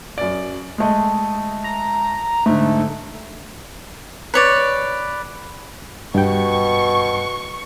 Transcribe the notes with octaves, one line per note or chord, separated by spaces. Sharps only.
F#2 D5
G#3 A3 D#5
A#5
G#2 D3 A3
B4 C#5 D5
G2 B2 G5 C#6